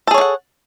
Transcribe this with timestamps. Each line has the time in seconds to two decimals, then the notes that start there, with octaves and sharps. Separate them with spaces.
0.07 A4
0.11 G#4
0.14 C#5
0.18 D4
0.21 F#5